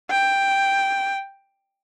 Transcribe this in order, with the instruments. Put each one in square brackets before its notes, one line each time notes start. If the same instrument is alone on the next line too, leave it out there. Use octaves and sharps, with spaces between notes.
[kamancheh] G5